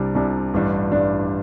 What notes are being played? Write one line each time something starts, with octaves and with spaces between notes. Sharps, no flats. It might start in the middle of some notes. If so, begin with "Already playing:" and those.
Already playing: C2 C3 G3 D4
C2 C3 G3 D4
A1 G2 G3 D4
A1 G2 G3 D4